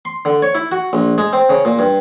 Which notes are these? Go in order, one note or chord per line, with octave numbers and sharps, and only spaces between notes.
C6
D3
C#5
E4
F#4
A#1
G#3
C4
C#3
A#2
G2